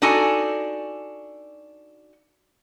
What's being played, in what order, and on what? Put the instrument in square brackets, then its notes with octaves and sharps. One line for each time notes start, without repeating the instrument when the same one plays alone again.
[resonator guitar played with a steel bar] D4 D#4 F#4 A4 G#5